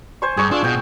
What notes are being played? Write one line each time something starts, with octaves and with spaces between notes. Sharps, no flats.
C5 G#5 C#6
G2 G#4 C#6
D4 F4 E6
B2 G5